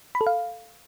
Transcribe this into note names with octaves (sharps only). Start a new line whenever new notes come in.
B5
A4
F5